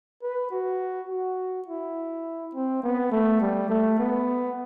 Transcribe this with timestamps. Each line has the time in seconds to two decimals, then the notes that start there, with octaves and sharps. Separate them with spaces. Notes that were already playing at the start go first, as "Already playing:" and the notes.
0.23 B4
0.51 F#4
1.09 F#4
1.68 E4
2.55 C4
2.83 B3
3.12 A3
3.40 G3
3.70 A3
3.99 B3